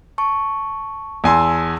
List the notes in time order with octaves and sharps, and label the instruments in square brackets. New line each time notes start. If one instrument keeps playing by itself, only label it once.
[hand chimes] A5 C#6
[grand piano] E2 G#5 C6 [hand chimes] A5 E6